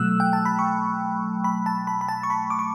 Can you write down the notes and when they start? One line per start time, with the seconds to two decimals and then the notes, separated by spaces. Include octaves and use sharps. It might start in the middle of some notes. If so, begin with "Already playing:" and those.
Already playing: B2 F#3 A3 E6 F#6
0.20 G5
0.33 A5
0.45 B5
0.59 C#6
1.44 B5
1.66 A5
1.87 B5
2.01 B5
2.08 A5
2.23 C#6
2.30 B5
2.50 D6
2.59 C#6